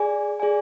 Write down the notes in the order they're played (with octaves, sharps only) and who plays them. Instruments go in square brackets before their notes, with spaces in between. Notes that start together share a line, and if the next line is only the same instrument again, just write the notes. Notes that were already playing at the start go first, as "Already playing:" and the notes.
Already playing: [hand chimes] G#4 D5 G#5
G#4 D5 G#5